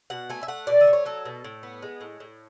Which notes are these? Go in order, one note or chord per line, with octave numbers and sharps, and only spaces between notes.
B2 F#5
A3 G#5
E5
A3 F#5
B2 D5
E5
A3
C#5
F#3 A4
B2
A2
B3
G#3
A2
A2